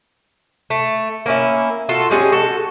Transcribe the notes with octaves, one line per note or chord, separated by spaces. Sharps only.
A3
A#3 C#4 E4
F4 F#4 A4
G3 G#3 C#4 G#4
F#4 A4